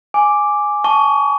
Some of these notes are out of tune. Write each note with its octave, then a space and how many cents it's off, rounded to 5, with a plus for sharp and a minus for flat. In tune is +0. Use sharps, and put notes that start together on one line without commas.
G#5 +0 D6 +0
A5 -15 C#6 +25